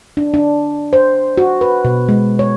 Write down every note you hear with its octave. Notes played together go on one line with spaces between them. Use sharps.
D4
D4
C5
F#4
B4
B2
G#3
C#5